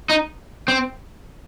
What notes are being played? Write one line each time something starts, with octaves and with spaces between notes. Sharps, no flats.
D#4
C4